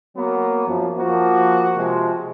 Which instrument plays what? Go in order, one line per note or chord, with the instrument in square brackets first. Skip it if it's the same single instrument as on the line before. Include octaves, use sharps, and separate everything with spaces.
[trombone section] F#3 A#3 B3
F#2 F3
F3 A#3 F#4
C3 F3 G#3